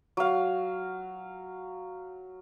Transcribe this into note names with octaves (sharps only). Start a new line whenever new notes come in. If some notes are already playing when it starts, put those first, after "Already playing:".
F#3 F5